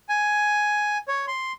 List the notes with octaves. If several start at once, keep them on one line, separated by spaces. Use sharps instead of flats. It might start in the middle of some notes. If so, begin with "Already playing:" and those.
G#5
C#5
C6